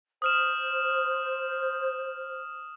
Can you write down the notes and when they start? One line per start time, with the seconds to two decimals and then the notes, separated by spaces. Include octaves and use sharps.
0.22 C5 D#6 F6 E7